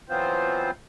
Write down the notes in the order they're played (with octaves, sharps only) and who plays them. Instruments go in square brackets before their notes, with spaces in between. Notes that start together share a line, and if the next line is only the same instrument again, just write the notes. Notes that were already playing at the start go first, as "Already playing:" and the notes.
[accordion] E3 F#3 B3 C4 F4 C5